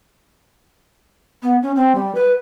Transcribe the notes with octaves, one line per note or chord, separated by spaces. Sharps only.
B3
C#4
C4
G3
B4